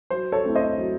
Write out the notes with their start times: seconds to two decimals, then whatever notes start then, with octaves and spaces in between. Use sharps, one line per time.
0.10 F#3 C5
0.32 A4 C#5
0.44 A3 C4 E4
0.55 C5 D#5
0.78 F#3